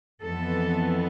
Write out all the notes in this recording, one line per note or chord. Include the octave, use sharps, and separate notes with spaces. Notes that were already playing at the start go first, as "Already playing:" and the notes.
F2 E3 B3 A4